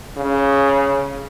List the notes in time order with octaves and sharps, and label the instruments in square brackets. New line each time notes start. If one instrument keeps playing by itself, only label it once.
[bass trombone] C#3